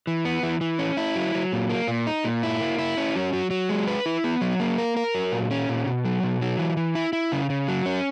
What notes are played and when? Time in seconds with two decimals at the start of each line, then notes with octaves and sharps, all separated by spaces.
0.07 E3
0.25 B3
0.43 E3
0.61 E3
0.79 C#4
0.97 E4
1.16 F#3
1.34 F#3
1.53 A#2
1.70 A#3
1.88 A#2
2.07 D#4
2.25 A#2
2.43 E4
2.60 A#3
2.79 E4
2.97 C#4
3.16 F#3
3.33 F#3
3.51 F#3
3.69 G#3
3.87 B4
4.06 E4
4.24 B3
4.41 F#3
4.60 A#3
4.78 A#4
4.97 A#4
5.15 F#3
5.32 A#2
5.51 C#4
5.69 A#2
5.86 B2
6.05 F#3
6.23 B2
6.41 F#3
6.59 E3
6.77 E3
6.95 E4
7.13 E4
7.32 C#3
7.50 C#3
7.68 F#3
7.86 C#4